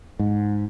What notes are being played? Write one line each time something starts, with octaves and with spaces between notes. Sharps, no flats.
G#2